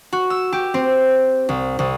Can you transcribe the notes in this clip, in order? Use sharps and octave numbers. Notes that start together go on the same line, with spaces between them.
F#4
E6
G4
C4
C2
C2